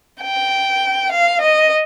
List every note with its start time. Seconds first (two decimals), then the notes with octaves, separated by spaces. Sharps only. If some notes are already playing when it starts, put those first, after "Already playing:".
0.21 G5
1.12 F5
1.41 D#5